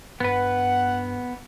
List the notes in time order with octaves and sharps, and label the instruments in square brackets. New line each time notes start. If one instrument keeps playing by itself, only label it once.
[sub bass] G2 [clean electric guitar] B3 B4 [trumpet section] F#5